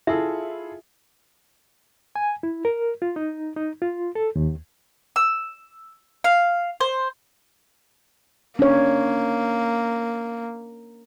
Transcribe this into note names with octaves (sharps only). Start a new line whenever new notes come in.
E4 F4 G#4 A4 E5
G#5
E4
A#4
F4
D#4
D#4
F4
A4
D#2
E6
F5
C5
A#3 C#4 D4 C#5